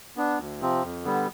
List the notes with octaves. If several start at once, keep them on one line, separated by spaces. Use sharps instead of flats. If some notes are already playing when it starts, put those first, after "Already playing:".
B3 D4
D2
C3 F3 C4
F2
D3 G3 B3